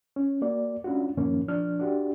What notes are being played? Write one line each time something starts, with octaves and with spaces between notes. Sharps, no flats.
C#4
A#3 F#4 D5
G#3 C#4 D4 F4 F#4
F#2 A2 D#3 F3 A#3 C#4
F3 D4 F6
D4 F#4 G4